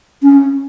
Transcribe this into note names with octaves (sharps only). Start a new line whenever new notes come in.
C#4